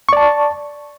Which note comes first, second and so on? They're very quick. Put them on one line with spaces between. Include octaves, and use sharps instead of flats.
C#6 D5 A5